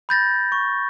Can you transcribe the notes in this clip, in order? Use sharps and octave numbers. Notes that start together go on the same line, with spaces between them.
B5 G6 A6 A#6
C#6